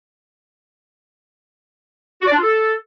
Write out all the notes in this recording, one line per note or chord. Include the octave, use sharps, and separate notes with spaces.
F#4
D5
D4
F4
A4